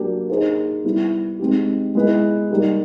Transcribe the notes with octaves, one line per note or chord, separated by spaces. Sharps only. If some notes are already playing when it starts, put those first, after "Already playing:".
Already playing: F#3 A#3 D4 G4
A#3 D#4 G#4 C5
G3 B3 E4
G#3 C4 D#4 G4
G#3 B3 E4 G#4 B4
G3 A#3 D#4 G4